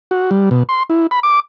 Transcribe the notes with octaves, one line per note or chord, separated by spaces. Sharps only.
F#4
G3
B2
C6
E4
B5
D6